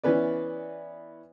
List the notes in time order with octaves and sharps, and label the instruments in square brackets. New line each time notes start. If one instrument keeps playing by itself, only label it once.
[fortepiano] E3 B3 C#4 B4 D5